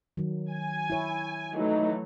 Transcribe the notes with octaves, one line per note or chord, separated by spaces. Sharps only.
D#3 F#3
G#5
E4 C#5
E3 F#3 A3 D#4